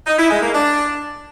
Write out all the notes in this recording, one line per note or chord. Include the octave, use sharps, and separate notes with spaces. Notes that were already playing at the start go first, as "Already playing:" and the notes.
D#4
E4
G#3
A#3
D4